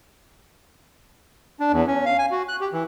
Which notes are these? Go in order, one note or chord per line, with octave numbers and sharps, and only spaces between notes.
D4
E2
C#4
F5
G#5
F#4
F#6
G4
E3